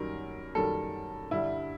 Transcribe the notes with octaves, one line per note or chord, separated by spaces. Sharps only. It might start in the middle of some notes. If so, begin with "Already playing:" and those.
Already playing: F#2 D#3 G3 A#4
F#2 D#3 G3 A4
G2 D3 G3 E4